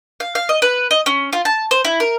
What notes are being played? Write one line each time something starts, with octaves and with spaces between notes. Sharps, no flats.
F5
F5
D#5
B4
D#5
C#4
F4
A5
C5
E4
A#4